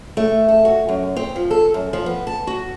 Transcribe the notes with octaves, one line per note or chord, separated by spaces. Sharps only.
A3
A4
F#4
F#2
C4
F3
A4
F#2
F3
B3
A5
F#4